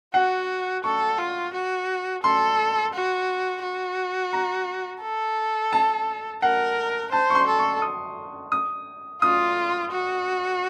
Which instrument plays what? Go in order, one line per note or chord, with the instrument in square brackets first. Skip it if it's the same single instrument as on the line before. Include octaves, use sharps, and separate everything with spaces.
[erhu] F#4 [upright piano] F#5
[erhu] A4 [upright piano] C#6
[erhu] F4
F#4
[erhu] A4 [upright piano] C6
[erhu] F#4
F#4
[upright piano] A#5
[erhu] A4
[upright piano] A5
[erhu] A#4 [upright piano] F#5
[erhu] C5 [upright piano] A5
[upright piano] C#6
C6
[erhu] A4
[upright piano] C#6
D#6
D#6
[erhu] F4 [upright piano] D#6
[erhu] F#4